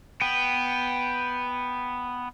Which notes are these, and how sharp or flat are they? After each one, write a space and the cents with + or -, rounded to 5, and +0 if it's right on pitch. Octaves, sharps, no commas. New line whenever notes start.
B3 +0 G5 +0